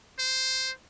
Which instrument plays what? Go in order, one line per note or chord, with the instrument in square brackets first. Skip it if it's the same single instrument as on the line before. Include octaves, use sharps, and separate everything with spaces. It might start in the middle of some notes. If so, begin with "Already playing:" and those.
[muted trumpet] C5